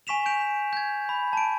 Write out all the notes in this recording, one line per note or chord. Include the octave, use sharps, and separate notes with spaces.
G#5 C#6 B6 E7 F7
G6 D7 F7
G6 G#6
B5
A5 D7